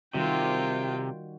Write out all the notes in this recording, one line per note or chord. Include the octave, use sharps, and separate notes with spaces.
C3 D#3 G3 F4 F#4 G5